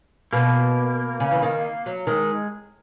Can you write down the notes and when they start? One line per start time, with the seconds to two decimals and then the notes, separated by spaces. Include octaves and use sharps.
0.33 B2 A#3
1.20 C#3
1.31 E3
1.42 D#3
1.86 F#3
2.07 D#3 G#3